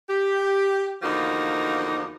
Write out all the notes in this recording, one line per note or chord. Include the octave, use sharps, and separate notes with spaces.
G4
E2 D3 F3 A#3 D#4 F#4